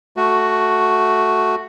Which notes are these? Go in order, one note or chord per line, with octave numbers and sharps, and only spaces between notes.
A3 F#4